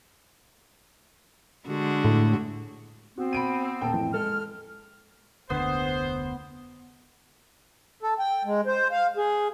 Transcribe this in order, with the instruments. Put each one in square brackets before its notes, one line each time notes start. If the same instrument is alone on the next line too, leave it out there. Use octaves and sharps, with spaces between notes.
[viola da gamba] D3 G#3 F#4
[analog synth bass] A2
[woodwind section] B3 C4 [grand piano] F#4
[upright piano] B5 D7 D#7
[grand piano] D#1 A#3 A5 [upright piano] G5
[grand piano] F2 A2 E3
[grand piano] G#3 [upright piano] A4 [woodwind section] F6
[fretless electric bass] F1 D2 D3 [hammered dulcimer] B3 [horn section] C5
[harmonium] A4
G5
G#3
C5
F5
G#4